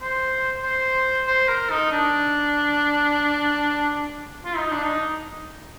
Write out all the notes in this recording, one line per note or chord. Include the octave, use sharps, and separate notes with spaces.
C5
C5
C5
A#4
D#4
D4
F4
D#4
D4
D#4